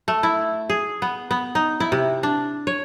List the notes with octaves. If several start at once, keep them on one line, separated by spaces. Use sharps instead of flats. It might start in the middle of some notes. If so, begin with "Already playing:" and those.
A3
E4
G#4
B3
B3
D#4
E4
C3
D4
C#5